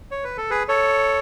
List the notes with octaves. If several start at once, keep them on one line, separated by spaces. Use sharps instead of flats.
C#5
B4
A4
G#4 B4
A4 C#5